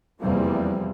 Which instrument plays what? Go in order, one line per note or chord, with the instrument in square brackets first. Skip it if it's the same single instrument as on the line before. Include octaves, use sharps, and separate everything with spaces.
[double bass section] F1 E2 C3 G3 A#3 C4